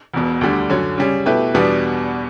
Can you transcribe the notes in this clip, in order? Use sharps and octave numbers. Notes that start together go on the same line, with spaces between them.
E1 E2 B2
D2 D3 G3 D4
F#2 D3 F#3 C#4
C#3 G3 C#4
B2 A3 E4 G4 B4
E2 B2 G3 B3 D4